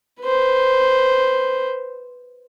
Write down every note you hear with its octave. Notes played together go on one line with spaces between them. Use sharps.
B4 C5